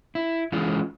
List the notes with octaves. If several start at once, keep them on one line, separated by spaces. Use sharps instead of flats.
E4
E3 G#3 C#4 F4